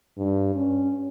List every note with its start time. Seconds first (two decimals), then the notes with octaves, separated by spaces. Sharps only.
0.17 G2
0.55 C#4